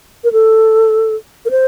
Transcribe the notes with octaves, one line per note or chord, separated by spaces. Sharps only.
A#4
A4
A#4
C5